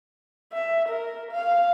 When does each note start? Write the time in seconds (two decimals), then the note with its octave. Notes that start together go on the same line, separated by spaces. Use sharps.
0.53 E5
0.88 A#4
1.31 F5